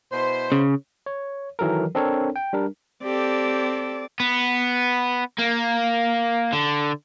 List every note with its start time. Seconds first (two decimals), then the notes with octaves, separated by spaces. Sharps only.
0.11 B2 E4 C5
0.52 C#3
1.06 C#5
1.59 D#3 E3 F#3 A4 A#4
1.95 C4 D4 A4 A#4 C#5
2.36 G5
2.53 G3 D4 A#4
3.03 C4 G4 A4 D5
4.20 B3
5.38 A#3
6.53 D3